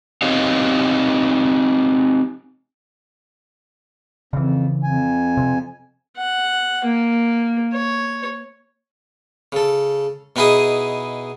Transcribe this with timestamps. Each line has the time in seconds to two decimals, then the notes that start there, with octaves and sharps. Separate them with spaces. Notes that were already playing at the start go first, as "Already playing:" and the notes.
0.22 C4 D#4 G4 C#5 D#5 F5
4.33 F2 C#3 E3
4.83 F2 G#5
5.37 C3
6.17 F#5
6.84 A#3
7.73 C#5
9.52 C#3 A4
10.36 B2 B3 D#4 E4 G#4 D#6